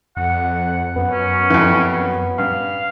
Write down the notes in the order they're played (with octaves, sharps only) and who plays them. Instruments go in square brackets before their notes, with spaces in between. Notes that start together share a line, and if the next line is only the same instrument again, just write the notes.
[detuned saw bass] F2 [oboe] F#5
[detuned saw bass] F#2 [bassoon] B3
[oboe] C#4
[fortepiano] F2 E3
[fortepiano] G2 [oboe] F5